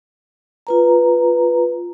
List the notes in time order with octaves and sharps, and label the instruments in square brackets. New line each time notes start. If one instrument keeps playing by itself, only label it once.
[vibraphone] F4 B4 A#5